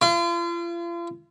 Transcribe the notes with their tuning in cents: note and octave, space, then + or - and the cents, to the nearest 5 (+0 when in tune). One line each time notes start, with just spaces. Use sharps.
F4 -40